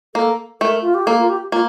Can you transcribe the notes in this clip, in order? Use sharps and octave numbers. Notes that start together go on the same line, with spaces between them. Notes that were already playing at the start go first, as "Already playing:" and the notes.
A#3 A4
A3 A#4
F4
G4
A#3 A4
F4
G4
A#3 F4